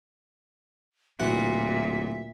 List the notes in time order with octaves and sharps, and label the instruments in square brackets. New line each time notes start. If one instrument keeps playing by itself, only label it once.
[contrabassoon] D1 [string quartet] A#2 [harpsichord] E3 F#4 F#5 [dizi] E5